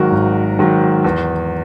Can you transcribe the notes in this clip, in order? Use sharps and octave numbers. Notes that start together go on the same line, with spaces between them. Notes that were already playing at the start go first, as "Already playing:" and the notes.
Already playing: G#1 G#2 D#3 F#3 F#4 A#4
G#1
G#2 D#3 F#3
E2